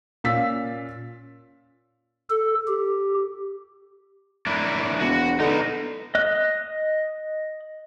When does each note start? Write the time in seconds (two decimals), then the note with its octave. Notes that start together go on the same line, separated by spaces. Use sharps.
0.24 A#2 C#4 F5 E6 A6 B6
2.30 A4
2.68 G4
4.47 A#3 D4 E4
5.00 E1 F#4
5.40 D3 B3 D#4
6.15 D#5 F#6